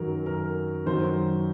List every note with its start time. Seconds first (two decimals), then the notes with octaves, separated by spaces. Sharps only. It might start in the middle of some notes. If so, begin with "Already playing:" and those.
Already playing: F#2 D#3 F#3 A#4
0.26 A#4
0.86 F#2 D#3 F#3 C5